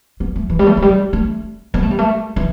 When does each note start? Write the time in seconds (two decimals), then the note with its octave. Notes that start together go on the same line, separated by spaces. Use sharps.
0.20 B3
0.36 A3
0.50 E3
0.59 G3
0.66 A3
0.77 E3
0.82 G3
1.13 A3
1.74 B3
1.83 A3
1.91 G3
1.99 A3
2.36 E3